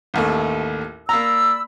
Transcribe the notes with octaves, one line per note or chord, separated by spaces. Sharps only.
A1 D#2 A3
A#3 D5 A#5 B5 E6